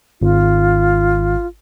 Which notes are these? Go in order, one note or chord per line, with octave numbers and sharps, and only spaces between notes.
G#1 F4